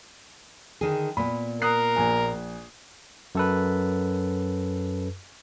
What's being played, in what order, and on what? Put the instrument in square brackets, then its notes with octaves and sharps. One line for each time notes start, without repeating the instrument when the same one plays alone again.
[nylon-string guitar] D3 D#3 G#4
[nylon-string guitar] A#2 B3 [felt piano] B5
[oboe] A#4 [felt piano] D#6 F#6 C7
[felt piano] A#1 G#5
[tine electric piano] F#2 A4 B4